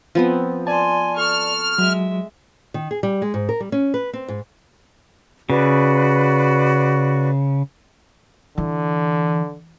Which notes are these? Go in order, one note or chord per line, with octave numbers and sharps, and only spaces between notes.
F3 B3 C4
D5 G#5 A5 C6
A4 C#6 F6
F#3 G#3 E5
D#3
G#4
G3
G#3
G#2
A#4
G3
C#4
B4
C4
G#2
C#3 F#4 B4 D5
D3 E3